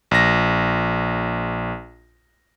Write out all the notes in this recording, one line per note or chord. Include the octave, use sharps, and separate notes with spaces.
A#1 A#6